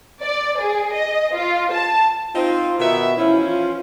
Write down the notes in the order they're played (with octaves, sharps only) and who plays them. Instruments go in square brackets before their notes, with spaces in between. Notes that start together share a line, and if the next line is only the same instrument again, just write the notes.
[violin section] D5
G#4
D#5
F4
A5
[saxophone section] C4 D#4 [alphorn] F4
[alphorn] B2 [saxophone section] D#3 B3 E5
[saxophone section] E3 F3 C#4 [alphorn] E4
[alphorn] F4